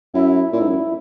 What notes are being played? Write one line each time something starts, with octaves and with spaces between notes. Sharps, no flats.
F#2 E4
A#2 E4
G#2
F#2